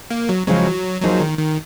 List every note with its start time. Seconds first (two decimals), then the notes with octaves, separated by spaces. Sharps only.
0.11 A#3
0.29 F#3
0.47 C#3 F3 F#3 G#3 C#4
1.02 F3 F#3 A#3 D#4 G#4 C5
1.20 D#3
1.38 D#3